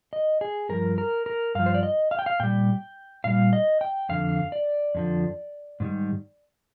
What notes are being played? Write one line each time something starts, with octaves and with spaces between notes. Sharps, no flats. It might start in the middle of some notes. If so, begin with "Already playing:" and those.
D#5
G#4
G2 F3 A#4
A#4
A#4
G2 F3 F5
C5
D5
D#5
F5
G5
F5
A#2 G3 G5
A#2 G3 F5
D#5
G5
F2 D3 F3 F5
D5
F2 D3 F3
G#2 D#3 G3